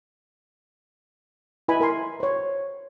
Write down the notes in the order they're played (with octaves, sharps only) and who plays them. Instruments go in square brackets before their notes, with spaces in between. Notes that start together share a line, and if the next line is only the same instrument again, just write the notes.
[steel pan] E4 B4 D#5 G#5 B5
A#4 G#5 C6
C5 C#5